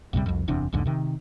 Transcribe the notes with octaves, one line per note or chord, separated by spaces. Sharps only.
A#1 F2 C3 G3
C2 F2
F#1 E2 C3 D4
B1 E2 G#2 D3
C3 D#3